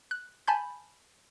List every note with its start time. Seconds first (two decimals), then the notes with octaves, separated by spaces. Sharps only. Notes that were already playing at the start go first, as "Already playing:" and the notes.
0.11 F#6
0.48 G#5 A5 B5 G6